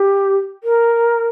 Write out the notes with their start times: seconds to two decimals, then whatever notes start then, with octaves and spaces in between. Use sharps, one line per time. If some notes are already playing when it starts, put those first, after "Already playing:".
Already playing: G4
0.63 A#4